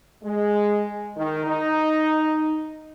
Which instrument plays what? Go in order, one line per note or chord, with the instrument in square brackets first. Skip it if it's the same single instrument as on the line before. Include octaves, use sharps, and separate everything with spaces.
[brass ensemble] G#3
D#3
D#4